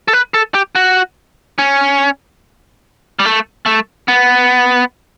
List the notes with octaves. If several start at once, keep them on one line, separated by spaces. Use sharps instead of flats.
A4
B4
A4
G4
F#4
C#4
G3
A3
A3
B3